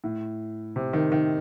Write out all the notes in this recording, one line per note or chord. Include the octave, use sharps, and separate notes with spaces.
A2
C3
D#3
D#3